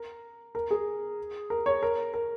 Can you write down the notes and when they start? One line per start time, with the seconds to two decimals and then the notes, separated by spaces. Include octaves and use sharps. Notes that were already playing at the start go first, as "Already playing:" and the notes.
Already playing: A#4
0.55 A#4
0.71 G#4
1.50 A#4
1.66 C#5
1.83 A#4
2.14 A#4